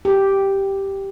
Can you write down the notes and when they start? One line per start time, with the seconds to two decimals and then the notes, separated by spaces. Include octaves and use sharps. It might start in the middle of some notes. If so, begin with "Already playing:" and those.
0.05 G4